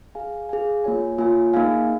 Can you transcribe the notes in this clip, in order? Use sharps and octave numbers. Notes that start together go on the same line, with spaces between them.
G#4 F5 G#5
G#4 F5 G#5
A#3 F4 C#5 G#5
A#3 F4 C#5 G#5
A#3 D#4 G#4 F5 G#5